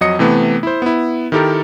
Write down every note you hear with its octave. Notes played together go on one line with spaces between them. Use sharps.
F2 F#3 D#5 D#6 C#7
C3 E3 A3 B3
E4 C5
B3 E4
D#3 E4 G4 A4 A#4